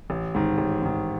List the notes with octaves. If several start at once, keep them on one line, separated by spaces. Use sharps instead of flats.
A1
G#2 D#3
A1
G#2 D#3